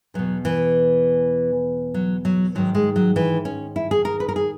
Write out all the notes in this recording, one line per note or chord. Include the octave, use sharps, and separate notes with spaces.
E2 B2 F#3
E3
F#3
F#3
G#2 D#3 F#3
G#3
F#3
E3
C#4
E4
G#4
A#4
B4
A#4
G#4